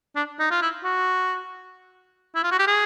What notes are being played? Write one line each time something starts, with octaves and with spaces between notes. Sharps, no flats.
D4
D#4
F4
E4
F#4
E4
F4
F#4
G4
G#4